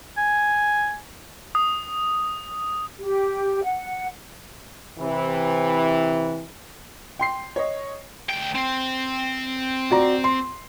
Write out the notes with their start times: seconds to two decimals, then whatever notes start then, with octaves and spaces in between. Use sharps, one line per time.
0.17 G#5
1.55 D#6
2.98 G4
3.62 F#5
4.99 C3 E3
7.19 G5 C6 C7
7.56 C#5 D#5
8.30 D2 G5
8.55 C4
9.90 F#4 D5 A#5
10.24 C6